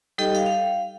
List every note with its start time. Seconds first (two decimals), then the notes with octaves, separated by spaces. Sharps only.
0.18 G3 D#4 G4 A4 D#5 G5
0.35 F5 G5
0.46 F5